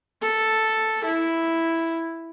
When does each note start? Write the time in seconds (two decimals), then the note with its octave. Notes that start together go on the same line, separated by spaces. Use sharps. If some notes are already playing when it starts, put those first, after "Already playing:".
0.22 A4
1.04 E4